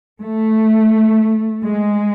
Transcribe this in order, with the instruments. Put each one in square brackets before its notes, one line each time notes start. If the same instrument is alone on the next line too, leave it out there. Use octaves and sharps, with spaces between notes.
[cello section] A3
G#3